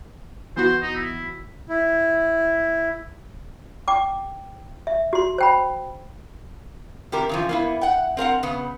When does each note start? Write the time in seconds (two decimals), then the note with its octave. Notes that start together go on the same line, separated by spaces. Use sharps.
0.56 E3 B3 F#4 C5
0.82 D#4
0.95 E4
1.69 E4
3.88 G5 D6
4.87 E5
5.13 F#4 C6
5.38 C5 G5 B5
7.12 C3 G4 A#4
7.29 C#3 E3 F3
7.49 A#3 B3 E4
7.81 F#5 G5
8.17 C4 A#4 F5 F#5
8.43 C#3 B3